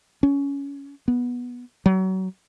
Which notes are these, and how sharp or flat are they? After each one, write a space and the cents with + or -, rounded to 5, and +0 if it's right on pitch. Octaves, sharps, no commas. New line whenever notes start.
C#4 +20
B3 -10
F#3 +30